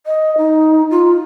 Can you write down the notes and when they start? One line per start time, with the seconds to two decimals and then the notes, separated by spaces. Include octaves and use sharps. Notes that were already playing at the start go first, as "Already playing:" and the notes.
0.06 D#5
0.38 D#4
0.91 F4